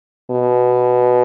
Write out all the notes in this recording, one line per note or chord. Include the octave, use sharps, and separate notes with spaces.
B2